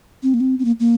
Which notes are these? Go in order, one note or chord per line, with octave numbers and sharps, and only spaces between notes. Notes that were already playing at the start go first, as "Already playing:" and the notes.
C4
A#3
C4
C4
A#3
A#3